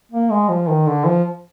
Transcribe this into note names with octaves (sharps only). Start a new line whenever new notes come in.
A#3
G#3
F3
D#3
D3
F3